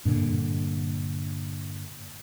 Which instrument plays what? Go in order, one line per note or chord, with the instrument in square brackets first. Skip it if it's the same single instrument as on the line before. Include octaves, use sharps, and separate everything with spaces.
[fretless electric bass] G2 A#2 D3